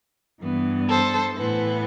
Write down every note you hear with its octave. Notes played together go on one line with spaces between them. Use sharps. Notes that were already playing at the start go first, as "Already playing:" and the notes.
G2 E3 B3
A4 C5
A2 E3 B3